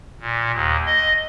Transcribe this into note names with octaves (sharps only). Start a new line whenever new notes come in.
A#2
D#2
D#5